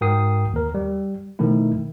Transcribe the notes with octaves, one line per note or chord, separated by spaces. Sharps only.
G#2 F#4 A#4 G5 D#6 C7
D#2 A#4
G3
B2 D#3 F3 A3 E4